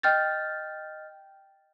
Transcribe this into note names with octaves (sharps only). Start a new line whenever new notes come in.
D#5 G5 F6 G6 A6